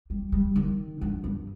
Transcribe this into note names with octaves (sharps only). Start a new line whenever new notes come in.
G3
G3
D#3
G2
G2